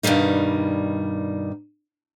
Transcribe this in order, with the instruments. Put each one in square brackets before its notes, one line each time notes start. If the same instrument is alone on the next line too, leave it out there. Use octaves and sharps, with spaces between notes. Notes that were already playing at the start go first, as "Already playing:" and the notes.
[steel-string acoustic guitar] G2 B2 D#3 G3 D#4